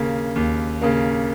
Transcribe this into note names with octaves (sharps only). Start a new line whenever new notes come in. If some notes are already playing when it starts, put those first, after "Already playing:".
Already playing: D#2 C#3 A#3
D#2
C#3 A#3